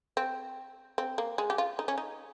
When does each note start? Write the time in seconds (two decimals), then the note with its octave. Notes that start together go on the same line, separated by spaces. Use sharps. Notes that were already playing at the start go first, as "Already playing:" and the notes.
0.17 C4
0.98 C4
1.18 A#3
1.38 G#3
1.50 G4
1.58 F4
1.79 D#4
1.88 C#4
1.98 D#4